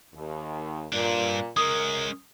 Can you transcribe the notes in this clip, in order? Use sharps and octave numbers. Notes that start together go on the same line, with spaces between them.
D#2
G2 A#2 D4
F#2 G#3 C#4 A#4 D#6